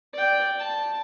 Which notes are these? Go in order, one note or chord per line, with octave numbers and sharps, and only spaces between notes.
D5 G5
A5